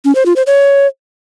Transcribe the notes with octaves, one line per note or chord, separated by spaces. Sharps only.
C#4
C5
F4
C5
C#5